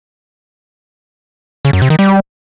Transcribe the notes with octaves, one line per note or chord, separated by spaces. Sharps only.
C#3
F#2
C3
D#3
G3